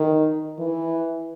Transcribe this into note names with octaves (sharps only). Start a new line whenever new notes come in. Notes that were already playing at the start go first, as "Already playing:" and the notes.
Already playing: D#3
E3